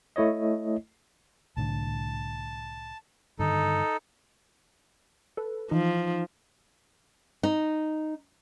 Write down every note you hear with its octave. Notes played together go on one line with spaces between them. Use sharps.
A3 E4 C#5 D#5
C2 A2 D3 A5
G2 D3 D#3 D#4 A4
A4 B4
E3 F3 D#4
D#4